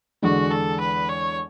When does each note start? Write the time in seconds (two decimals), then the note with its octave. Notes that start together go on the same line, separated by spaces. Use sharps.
0.22 E2 D3 G#3 F#4
0.51 A4
0.80 B4
1.09 C#5